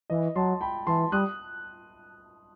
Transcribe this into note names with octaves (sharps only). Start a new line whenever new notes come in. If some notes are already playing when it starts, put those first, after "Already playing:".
E3 D#5
F#3 A5 C6
G5 B5
E3 A5 C6
G3 D#6 F#6